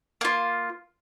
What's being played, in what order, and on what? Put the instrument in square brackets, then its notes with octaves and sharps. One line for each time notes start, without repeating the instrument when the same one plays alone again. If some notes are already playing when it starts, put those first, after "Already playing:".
[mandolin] A#3 F4